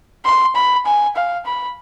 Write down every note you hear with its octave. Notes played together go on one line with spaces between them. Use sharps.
C6
B5
G#5
F5
B5